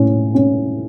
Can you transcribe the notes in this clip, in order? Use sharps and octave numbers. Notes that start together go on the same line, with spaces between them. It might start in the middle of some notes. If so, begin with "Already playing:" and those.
Already playing: A2 C#4
C#4